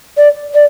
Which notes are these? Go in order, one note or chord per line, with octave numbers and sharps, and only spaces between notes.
D5
D5